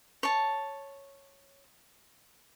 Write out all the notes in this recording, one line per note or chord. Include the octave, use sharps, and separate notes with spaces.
C#5 A5